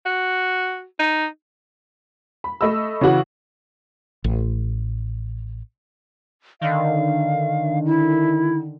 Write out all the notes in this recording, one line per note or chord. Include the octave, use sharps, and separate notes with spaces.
F#4
D#4
B5
A3 D#5 B5 E6
C#3 E3 F#4 F#7
A1
D3 D#3 F5
E4